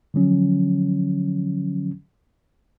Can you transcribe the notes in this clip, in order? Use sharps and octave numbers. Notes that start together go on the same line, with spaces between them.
D3 F3 F#3 C#4